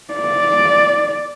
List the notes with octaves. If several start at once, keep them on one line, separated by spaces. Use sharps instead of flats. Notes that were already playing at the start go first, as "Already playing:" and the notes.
D5